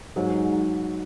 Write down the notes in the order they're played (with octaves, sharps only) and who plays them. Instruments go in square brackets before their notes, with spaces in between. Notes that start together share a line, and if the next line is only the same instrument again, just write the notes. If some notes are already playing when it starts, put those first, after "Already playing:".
[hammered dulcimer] G#2 [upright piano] F#3